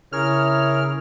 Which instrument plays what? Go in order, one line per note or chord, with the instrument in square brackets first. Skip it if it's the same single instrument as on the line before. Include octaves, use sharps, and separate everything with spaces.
[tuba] C#3 [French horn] E4 [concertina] G#4 A#4 C#5 [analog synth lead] F6